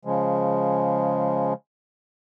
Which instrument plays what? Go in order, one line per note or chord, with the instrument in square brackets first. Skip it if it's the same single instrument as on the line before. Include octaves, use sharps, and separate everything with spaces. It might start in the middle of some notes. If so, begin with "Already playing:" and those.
[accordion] C#3 F3 G#3